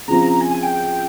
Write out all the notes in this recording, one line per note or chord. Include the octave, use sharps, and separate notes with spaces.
C#3 F3 C4 A#5
G#5
G#5
G5